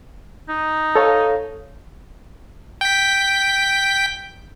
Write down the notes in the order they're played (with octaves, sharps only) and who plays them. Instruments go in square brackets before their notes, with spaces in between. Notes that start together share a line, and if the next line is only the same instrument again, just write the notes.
[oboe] D#4
[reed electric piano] A4 C#5 F5
[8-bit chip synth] G5 B6